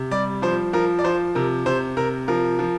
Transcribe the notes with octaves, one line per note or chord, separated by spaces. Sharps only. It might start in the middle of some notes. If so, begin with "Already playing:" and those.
Already playing: C3
G3 D5
F3 C5
F3 A#4
D5
F3 C5
C3 A#4
C3 C5
C3 A#4
F3 A#4
F3